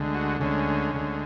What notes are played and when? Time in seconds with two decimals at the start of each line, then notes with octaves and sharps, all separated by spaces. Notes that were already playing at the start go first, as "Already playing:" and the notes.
Already playing: D2 D3 G#3
0.15 F#4
0.41 D2 D3 G#3 C#4
0.94 D2 D3 G#3